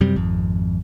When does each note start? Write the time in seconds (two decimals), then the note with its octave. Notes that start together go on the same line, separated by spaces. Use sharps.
0.01 F#2 C3 G3
0.16 G#1 F2